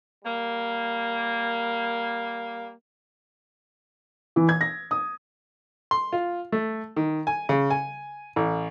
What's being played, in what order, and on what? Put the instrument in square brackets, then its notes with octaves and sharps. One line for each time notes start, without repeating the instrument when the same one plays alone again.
[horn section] G3 A#3
[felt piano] E3
G#6
A#6
D#6
[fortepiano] C6
F4
A3
D#3
G#5
C#3
G#5
A1